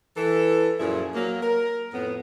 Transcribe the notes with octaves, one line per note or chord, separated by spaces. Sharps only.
E3 A4
F#2 A#2 F3 E4 G#4
F#3 A#3
A#4
F2 A2 B3